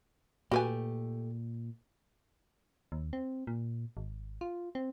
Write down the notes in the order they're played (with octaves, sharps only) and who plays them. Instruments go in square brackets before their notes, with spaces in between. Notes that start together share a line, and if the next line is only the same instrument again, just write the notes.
[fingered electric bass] A#2 [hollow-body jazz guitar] A3 G4 [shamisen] F#4 B4 G#5
[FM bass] D#2
C4
A#2
G#1
F4
C4